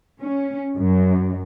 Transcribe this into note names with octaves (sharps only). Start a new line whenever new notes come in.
C#4
F#2